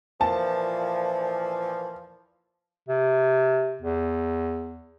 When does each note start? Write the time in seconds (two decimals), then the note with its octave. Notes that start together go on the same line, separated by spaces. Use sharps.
0.21 A#2 E3 F3 A5
2.89 C3
3.82 E2